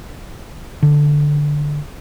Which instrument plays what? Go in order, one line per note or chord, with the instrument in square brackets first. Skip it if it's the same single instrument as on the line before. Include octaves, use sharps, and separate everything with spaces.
[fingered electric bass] D3